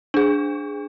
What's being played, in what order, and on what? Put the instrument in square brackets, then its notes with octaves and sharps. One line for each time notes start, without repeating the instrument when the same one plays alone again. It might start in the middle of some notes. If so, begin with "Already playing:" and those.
[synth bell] D4 G#4